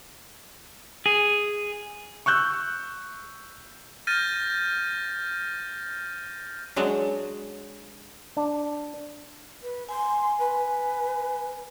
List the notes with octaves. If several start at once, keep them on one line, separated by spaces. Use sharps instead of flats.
G#4
C#6 E6 F#6 G6
F6 G6 A6 A#6 D#7
F#3 G#3 D4 F#4
D4
B4
G#5 C6
B4